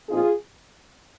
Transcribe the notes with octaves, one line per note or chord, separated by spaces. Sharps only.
A#2 F3 C4 D#4 F4 G#4